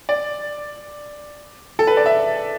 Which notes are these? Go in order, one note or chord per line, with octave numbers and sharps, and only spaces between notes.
D5
A4
B4
D5
E5